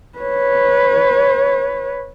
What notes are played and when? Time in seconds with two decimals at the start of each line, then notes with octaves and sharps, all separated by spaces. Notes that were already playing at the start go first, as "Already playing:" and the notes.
0.19 B4 C#5